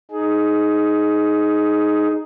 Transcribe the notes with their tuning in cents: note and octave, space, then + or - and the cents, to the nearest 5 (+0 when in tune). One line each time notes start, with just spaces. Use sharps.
D#4 +0 G#4 +15